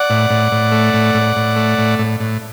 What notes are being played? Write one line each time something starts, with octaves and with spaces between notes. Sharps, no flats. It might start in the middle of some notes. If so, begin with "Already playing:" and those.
Already playing: D5 F#5
A2
A2
A2
A3
A2
A2
A2
A3
A2
A2
A2